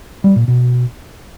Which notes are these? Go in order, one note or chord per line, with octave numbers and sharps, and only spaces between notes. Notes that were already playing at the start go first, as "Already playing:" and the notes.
G3
A#2
B2